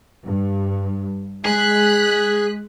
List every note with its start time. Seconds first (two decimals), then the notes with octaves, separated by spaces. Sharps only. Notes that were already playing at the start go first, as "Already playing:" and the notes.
0.23 G2
1.45 G#3 G#4 F#6 B6